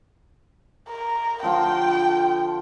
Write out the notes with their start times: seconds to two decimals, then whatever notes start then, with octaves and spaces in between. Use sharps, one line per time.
0.89 A#4
1.43 D3 F3 F4 G5